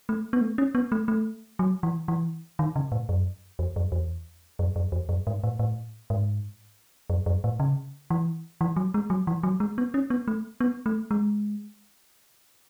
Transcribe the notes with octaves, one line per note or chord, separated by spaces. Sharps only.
A3
B3
A3
C#4
B3
A3
A3
F#3
E3
E3
D#3
C#3
A2
F#2
E2
F#2
E2
F#2
F#2
E2
F#2
G#2
A2
A2
G#2
F#2
F#2
A2
C#3
E3
E3
F#3
G#3
F#3
E3
F#3
G#3
B3
C#4
B3
A3
B3
A3
G#3